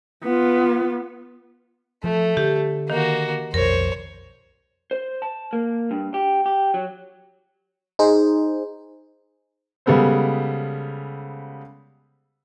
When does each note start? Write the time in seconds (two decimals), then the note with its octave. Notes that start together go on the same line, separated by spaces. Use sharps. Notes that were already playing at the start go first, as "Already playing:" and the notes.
0.24 B3 F4
2.04 F3 A3
2.37 D3 G4
2.90 D#3 A#3 F#4
3.54 B1 F2 A#4 C5 C#5
4.91 C5
5.22 A5
5.53 A#3
5.91 G2
6.14 G4
6.46 G4
6.74 F#3
7.99 D#4 G#4 C5
9.86 C#3 G3 G#3 B3 A4 C5